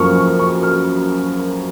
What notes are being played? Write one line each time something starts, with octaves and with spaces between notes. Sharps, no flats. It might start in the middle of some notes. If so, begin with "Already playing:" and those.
Already playing: F#2 F3 A#3 C#6 F6
C#6
C#6
F6